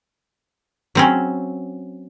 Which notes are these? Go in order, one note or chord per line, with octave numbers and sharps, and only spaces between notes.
F#3 C4 C#4